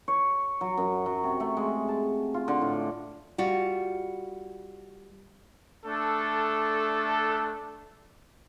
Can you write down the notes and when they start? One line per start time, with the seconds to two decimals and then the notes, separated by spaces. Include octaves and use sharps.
0.08 C#5
0.61 F#3
0.77 F#2
1.06 F#3
1.24 C3
1.40 A3
1.57 G#3
1.89 A5
2.34 F4
2.48 D3
2.62 A2
3.38 G3 F4 F#4
5.85 A3 D4 A4